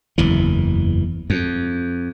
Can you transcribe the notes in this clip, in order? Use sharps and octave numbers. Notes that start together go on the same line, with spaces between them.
F#1 E2 E3
F2